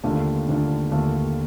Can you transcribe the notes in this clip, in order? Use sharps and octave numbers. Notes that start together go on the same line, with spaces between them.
D#2 D3 A3 D4 F4
D#2 D3 A3 D4 F4
D#2 D3 A3 D4 F4